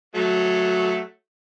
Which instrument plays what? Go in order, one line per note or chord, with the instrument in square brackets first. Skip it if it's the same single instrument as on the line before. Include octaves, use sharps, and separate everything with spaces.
[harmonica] F#3 A3